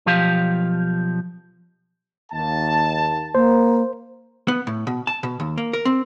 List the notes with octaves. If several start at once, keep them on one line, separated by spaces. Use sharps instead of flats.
B1 F3 G4 F5
D#2 A5
A#3 C5
B3
A2
B2
A5
B2
D#2
A#3
A#4
C4